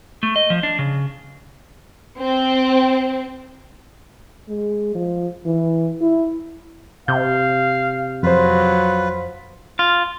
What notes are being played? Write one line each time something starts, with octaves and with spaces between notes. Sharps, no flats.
A3
D#5
F3
D4
C#3
C4
G#3
F3
E3
E4
C3 F5 G6
F2 F#3 F4 B4 C5
F4